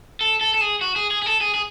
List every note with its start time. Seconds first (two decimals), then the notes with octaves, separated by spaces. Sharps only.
0.21 A4
0.41 A4
0.54 A4
0.61 G#4
0.81 F#4
0.96 G#4
1.11 G#4
1.22 G#4
1.26 A4
1.41 G#4
1.55 G#4